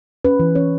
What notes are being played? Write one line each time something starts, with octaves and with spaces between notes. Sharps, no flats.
C#4 B4
E3
C#4 C#5